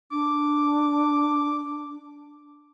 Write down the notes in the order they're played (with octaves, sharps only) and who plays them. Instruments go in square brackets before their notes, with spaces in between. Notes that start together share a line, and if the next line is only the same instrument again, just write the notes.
[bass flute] D4 [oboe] D6